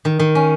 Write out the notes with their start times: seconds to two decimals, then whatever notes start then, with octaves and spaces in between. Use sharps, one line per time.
0.05 D#3
0.19 D#3
0.35 C#4